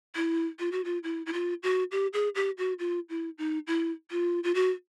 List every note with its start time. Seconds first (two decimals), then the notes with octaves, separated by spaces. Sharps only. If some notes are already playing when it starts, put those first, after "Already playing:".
0.16 E4
0.59 F4
0.72 F#4
0.85 F4
1.03 E4
1.26 E4
1.33 F4
1.63 F#4
1.92 G4
2.13 G#4
2.35 G4
2.58 F#4
2.79 F4
3.09 E4
3.38 D#4
3.67 E4
4.11 F4
4.44 F4
4.55 F#4